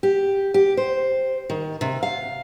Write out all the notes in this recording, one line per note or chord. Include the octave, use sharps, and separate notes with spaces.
G4
G4
C5
D#3
C3
F5